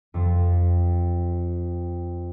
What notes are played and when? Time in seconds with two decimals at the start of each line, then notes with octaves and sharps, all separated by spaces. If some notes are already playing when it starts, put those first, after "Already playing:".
0.14 F2 F3